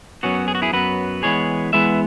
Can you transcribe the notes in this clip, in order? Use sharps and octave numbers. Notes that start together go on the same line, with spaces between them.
F#2 F#3 B3 C#4 F#4
G#4
F#4
E4 G#4
F#2 F#3 B3 F#4 B4
E2 E3 G#3 B3 G#4 C#5
E2 E3 G#3 B3 B4 E5